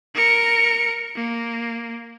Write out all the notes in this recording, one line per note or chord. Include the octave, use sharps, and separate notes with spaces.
A#4 C#7
A#3